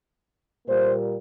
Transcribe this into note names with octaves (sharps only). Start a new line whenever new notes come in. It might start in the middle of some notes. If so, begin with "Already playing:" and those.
A#2 G3 A#3 C5